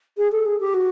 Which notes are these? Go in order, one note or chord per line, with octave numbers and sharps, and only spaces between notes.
G#4
A4
G#4
G4
F#4